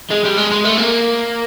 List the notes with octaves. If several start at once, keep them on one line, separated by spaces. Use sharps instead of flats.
G#3
G3
G#3
G#3
A3
A#3